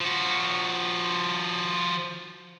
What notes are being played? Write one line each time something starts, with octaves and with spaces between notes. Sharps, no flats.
F3 F#4